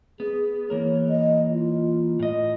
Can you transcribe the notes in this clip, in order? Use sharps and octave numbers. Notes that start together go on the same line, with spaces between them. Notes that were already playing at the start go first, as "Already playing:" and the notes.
B3 G#4
E3 A#3 A#4 C#5
D#5
F4
A2 D#5